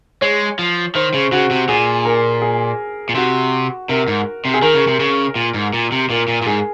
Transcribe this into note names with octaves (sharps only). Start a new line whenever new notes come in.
G#3 C#5
F3
D#3 C5
C#3
C#3 F#4
C3
A#2 G#4
A#4
G#4
A#2
C3 F#4
C3 A#4
G#2
C3
G#4
D#3 A#4
C#3
C3
C#3
A#2
G#2
A#2
C3
A#2 A#4
A#2
A#2
G#2 G#4